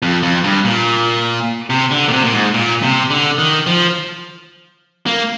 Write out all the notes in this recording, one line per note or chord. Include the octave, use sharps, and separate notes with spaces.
F2
F2
G2
A#2
C3
D3
A#2
C3
A#2
G#2
A#2
C3
D3
D#3
F3
A#3